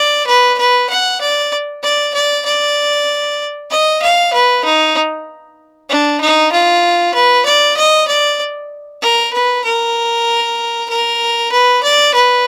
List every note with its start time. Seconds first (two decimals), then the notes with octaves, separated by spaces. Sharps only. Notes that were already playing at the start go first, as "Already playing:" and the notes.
Already playing: D5
0.27 B4
0.58 B4
0.90 F#5
1.21 D5
1.83 D5
2.14 D5
2.46 D5
3.70 D#5
4.02 F5
4.33 B4
4.64 D#4
5.90 D4
6.21 D#4
6.52 F4
7.14 B4
7.46 D5
7.77 D#5
8.08 D5
9.02 A#4
9.33 B4
9.64 A#4
10.89 A#4
11.52 B4
11.83 D5
12.14 B4